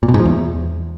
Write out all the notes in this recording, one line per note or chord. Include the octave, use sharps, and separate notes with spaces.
A#2
B2
G#2
F3
E2